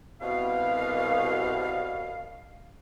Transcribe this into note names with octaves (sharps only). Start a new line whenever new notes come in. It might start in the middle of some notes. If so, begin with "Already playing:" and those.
C2 B2 F5